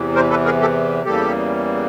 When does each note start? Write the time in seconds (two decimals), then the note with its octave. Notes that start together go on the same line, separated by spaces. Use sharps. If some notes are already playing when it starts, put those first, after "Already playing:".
Already playing: E2 C3 E3
0.15 A#4 C5
0.30 A4 B4
0.45 G#4 A#4
0.61 G4 A4
1.05 E2 C#3 E3 G3 A#3 G4 A4